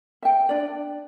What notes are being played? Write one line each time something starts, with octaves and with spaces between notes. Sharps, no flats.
E5 G5
D4 D5